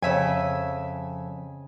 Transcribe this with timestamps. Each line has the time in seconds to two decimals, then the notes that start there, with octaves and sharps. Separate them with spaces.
0.02 F2 C#3 E5 G#5